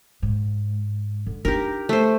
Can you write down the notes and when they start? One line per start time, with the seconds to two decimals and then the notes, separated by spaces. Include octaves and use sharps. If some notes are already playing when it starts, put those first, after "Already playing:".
0.22 G#2
1.26 D3
1.45 D4 D#4 G4 A#4
1.89 A3 C5